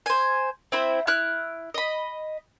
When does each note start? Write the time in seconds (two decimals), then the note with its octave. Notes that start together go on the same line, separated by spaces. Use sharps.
0.06 C5 G#5
0.72 C4 E4 C5
1.07 E4 F6 F#6
1.74 D#5 B5